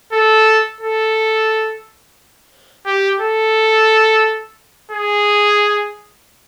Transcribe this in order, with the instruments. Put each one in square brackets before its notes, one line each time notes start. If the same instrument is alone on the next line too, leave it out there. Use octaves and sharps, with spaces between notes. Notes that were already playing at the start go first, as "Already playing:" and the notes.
[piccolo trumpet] A4
A4
G4
A4
G#4